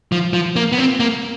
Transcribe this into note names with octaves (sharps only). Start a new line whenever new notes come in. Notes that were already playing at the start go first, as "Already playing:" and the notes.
F3
F3
A#3
B3
C4
A#3